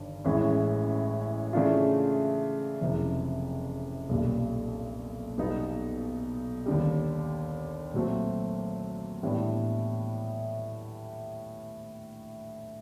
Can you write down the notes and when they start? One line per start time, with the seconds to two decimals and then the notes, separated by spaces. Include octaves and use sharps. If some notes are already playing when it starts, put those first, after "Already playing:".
Already playing: G1 G2 D#3
0.24 A1 A2 E3 G#3 C#4
1.53 C#3 E3 A3 D4 F4
2.81 F#1 F2 C3 E3
4.09 B1 A#2 G3
5.38 B1 B2 G3 B3 D#4
6.66 D#2 D3 G3
7.94 A#2 F#3 A3 C4
9.23 A2 E3 G3 B3 D4